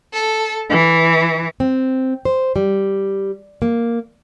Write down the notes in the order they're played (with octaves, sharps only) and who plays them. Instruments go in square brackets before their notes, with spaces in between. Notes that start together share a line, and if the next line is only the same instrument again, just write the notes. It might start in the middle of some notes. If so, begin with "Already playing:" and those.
[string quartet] A4
E3
[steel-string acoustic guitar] C4
C5
G3
A#3